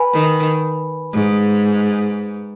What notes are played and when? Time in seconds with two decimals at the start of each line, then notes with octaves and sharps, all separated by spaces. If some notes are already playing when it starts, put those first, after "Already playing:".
Already playing: B4 G#5 B5
0.13 D#3
1.13 G#2